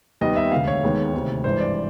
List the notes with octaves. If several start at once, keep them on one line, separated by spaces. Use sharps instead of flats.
D#2 D#3 G3 B3 D#5
E5
E1 D2 D3 F5
C#5
D#2 D#3 G#3 B3
D2 C3 D#3
G#1 G2 E3 C5
D5